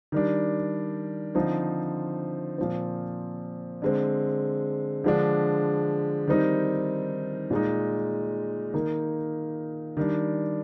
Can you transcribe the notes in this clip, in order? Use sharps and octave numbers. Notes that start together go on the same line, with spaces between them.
D#3 G3 D4
D3 F3 C4 D#4
A#2 F3 C4
D3 G#3 C4
D3 F3 G#3 D4
D#3 G3 C4 D#4
A#2 G#3 D#4
D#3 A#3 D#4
D#3 G3 D4